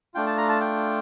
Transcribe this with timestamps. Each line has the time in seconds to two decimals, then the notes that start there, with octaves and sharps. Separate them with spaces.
0.14 A3 D4 F4 G5
0.27 A5
0.38 A#5
0.49 A5
0.61 G5